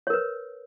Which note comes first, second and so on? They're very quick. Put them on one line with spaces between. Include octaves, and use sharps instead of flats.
C#5 A#4 B4